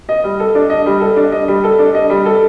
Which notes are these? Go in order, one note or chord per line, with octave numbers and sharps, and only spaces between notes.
D#5
G3
A4
D4
D#5
G3
A4
D4
D#5
G3
A4
D4
D#5
G3
A4